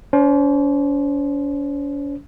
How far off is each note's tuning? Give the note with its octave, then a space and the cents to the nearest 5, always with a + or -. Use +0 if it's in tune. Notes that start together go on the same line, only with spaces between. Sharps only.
C#4 +45 C5 +5